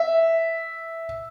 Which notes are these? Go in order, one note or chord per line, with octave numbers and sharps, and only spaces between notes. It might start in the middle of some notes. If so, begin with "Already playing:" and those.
Already playing: E5